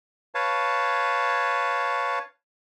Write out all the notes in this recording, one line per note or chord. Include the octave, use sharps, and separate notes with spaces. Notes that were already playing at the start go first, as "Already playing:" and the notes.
B4 C#5 F5 A5